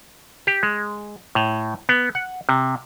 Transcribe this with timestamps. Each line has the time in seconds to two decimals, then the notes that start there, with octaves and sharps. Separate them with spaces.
0.47 G4
0.63 G#3
1.35 A2
1.89 B3
2.15 F#5
2.49 C3